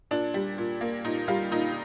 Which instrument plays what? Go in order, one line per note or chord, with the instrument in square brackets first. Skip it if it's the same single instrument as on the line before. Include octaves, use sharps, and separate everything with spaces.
[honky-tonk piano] A#2 D4
G3
A#2
A#3
A#2 D#4
G3 F4
A#2 D#4